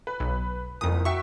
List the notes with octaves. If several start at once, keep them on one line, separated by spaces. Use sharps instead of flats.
B4
B1
F#1 C2 F2 D#6
F#4 E5 G5 C#6